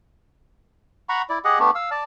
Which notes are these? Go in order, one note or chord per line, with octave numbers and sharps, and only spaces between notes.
F#5 A#5 B5 C#6
E4 D5
G4 G#4 D#5 F#5
A3 B3 D4 G4
F5 E6
D5 A5